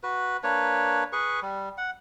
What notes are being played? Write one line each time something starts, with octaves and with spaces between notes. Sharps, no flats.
F#4 B4
A#3 D4 B4 C#5
G#4 B4 C#6
G3
F#5